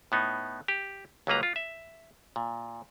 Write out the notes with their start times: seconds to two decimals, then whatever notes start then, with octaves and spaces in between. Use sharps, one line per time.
0.12 A2 B3 D#4
0.68 G4
1.27 C#2 F#3 G3 A#3 B4 A#5
1.43 F4
1.56 E5
2.36 A#2